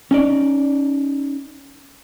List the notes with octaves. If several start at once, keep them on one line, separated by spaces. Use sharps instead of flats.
C#4 D#4 D5